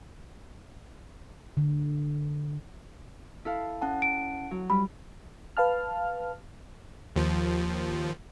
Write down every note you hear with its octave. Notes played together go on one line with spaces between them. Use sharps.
D3
E4 A4 F5
C#4 F#5 A5
D7
F#3
G3 B5
B4 F5 A5 F6
D#2 F3